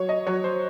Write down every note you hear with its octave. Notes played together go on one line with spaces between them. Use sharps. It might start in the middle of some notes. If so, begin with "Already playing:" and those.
Already playing: F#3 C#5
D#5
F#3 C#5
C5